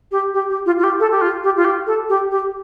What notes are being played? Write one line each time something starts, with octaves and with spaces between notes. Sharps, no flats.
G4
G4
G4
F4
F4
G4
A4
G4
F4
G4
F4
G4
A4
G4
G4